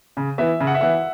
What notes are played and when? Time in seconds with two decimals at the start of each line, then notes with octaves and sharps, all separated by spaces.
0.17 C#3
0.38 E3 B3 E4 E5
0.60 C#3
0.67 F#5
0.74 E5
0.81 E3 B3 E4 F#5